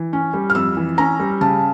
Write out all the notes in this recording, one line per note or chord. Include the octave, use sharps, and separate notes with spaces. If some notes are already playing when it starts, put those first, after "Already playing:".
Already playing: E3
C#4
G3
F6
F2 E6
E3
C#4 A#5
G3
C#3 A5